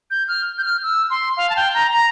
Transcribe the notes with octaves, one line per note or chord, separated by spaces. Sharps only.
G6
F6
G6
F6
E6
C6
F5
A5
G5
A#5
A#5